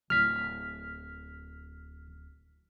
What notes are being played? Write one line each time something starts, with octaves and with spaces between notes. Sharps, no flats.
D1 F6 B6